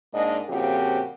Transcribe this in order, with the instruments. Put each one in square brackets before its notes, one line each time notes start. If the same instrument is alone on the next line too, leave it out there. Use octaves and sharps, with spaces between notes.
[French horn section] G#2 A#3 D4 D#5
A#2 C#3 F3 C4 F#4 G4